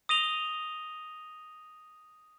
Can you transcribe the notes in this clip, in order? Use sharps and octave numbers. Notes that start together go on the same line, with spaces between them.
D#6 A#6 D#7 F7 G7